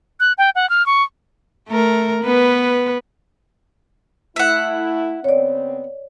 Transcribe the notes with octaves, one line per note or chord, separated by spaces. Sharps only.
F#6
G5
F#5
F6
C#6
A3 A#4
B3 B4
A3 E4 E5 F#5
C#3 B3 C4 C#5 D5